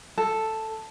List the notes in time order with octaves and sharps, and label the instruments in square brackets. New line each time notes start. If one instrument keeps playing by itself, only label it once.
[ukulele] A4